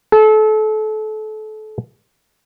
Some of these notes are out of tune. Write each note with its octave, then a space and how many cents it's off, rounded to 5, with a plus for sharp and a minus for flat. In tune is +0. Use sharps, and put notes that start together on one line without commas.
A4 -30